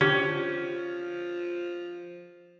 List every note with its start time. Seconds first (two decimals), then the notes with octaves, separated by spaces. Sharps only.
0.01 D3 F3 C#4 G4